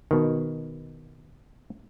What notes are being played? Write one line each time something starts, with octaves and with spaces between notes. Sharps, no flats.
B2 D#3